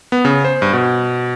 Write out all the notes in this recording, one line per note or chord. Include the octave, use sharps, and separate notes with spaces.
B3
C#3
C5
G2
B2